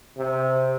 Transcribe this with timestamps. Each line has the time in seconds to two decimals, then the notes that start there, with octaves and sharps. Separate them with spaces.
0.18 C3